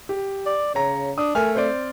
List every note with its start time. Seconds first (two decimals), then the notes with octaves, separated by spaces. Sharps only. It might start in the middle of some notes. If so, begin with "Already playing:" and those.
0.09 G4
0.46 D5
0.75 C#3 C#5 A#5
1.18 D4 D#6
1.35 A3 A#4 G#5 F6
1.55 C4 C5 D5